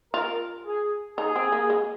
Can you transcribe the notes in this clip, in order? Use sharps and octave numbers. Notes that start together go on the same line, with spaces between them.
F4 A#4
G#4
D#4 G#4
C4
A#3
G#3